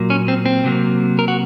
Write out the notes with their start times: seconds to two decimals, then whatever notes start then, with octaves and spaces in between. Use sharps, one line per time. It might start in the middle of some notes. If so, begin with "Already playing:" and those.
Already playing: A#2 F#3 A#3
0.10 C#4
0.28 C4
0.46 C4
0.64 C3 F#3 A#3
1.19 A#4
1.28 F#4